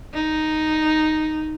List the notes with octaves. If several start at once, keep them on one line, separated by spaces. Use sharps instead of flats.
D#4